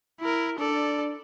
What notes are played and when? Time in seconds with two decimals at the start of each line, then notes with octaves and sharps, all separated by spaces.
0.20 E4 A#4
0.59 D4 A4 D5